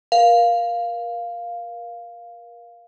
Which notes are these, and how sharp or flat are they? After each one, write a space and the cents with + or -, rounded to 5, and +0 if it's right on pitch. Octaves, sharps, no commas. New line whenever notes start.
A#4 +30 F5 +0